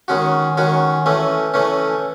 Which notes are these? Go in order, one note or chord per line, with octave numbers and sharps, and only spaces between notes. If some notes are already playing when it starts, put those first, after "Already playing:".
D#3 G#3 C#4 F#4
D#3 G#3 C#4 F#4
E3 A3 C#4
E3 A3 C#4